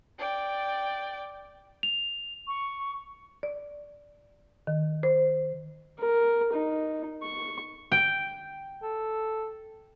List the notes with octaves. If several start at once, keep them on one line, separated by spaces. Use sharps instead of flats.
D5 G5
F7
C#6
D5
D#3
C5
A#4
D#4
C#6
G5
A4